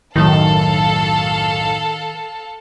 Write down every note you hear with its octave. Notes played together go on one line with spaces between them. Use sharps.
B1 F#2 A2 D#3 A4 F5 A5